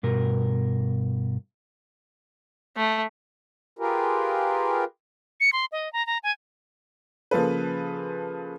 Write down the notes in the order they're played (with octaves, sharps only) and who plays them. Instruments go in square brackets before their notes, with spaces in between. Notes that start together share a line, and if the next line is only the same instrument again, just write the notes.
[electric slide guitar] G2 B2 A#4
[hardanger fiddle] A3
[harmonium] F4 G4 G#4 A#4 B4
[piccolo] C#7
C6
D#5
A#5
A#5
G#5
[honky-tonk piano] C#3 F3 A#3 A4 B4